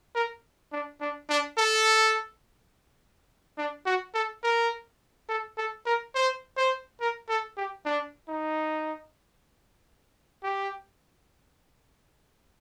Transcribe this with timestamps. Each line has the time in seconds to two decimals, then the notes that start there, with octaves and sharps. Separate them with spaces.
0.15 A#4
0.72 D4
1.01 D4
1.30 D4
1.58 A4
3.58 D4
3.86 F#4
4.14 A4
4.44 A#4
5.29 A4
5.57 A4
5.86 A#4
6.15 C5
6.57 C5
7.00 A#4
7.29 A4
7.57 G4
7.85 D4
8.29 D#4
10.43 G4